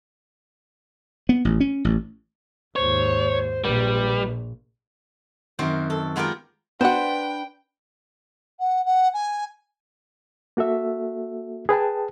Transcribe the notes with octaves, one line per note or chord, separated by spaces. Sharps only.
B3
A1
C#4
A1
D#2 G#2 C5 C#5
A#1 A#2 G3 B4
F#2 D#3 C4 F#4 C5
A4
G#3 B3 F4 G4 A#4 G5
B3 D4 F#4 B4 C5 F#5 G5
F#5
F#5
G#5
A#3 F#4 A4 E5
G#4 B4 G5 A5